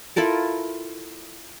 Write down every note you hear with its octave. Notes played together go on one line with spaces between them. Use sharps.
E4 F4 A4 A#4